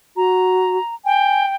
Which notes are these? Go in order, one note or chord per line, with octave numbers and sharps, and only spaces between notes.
F#4 A#5
G5 G#5